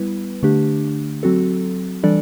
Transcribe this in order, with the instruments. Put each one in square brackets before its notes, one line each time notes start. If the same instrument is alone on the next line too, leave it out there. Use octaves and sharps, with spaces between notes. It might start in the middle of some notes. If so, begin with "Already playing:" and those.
Already playing: [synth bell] G3 B3 E4 B4
D3 A3 D4 G4
F#3 C4 F#4 A4
E3 G3 D4 A4 D5